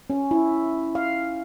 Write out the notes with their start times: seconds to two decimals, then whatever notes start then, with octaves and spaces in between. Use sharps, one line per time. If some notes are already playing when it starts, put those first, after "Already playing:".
0.10 C#4
0.31 E4
0.95 F5